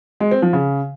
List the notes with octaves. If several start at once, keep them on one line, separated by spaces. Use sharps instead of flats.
G#3
C4
F3
C#3